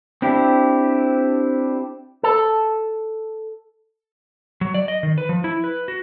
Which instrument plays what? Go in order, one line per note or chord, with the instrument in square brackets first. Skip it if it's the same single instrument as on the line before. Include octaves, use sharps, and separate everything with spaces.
[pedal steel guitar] C4 D4 E4 G4
[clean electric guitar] A4
[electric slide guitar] F#3
D5
D#5
D#3
B4
F3
E4
B4
F#4